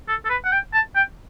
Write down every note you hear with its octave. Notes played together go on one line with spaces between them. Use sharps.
A4
A4
B4
F#5
G5
A5
G5